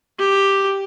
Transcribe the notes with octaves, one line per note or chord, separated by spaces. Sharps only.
G4